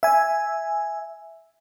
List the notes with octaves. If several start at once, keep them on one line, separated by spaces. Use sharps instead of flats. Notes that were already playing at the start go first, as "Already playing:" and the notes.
E5 G#5